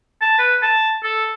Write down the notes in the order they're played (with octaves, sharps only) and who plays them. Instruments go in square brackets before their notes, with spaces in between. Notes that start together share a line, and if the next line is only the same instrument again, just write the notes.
[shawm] A5
B4
A5
A4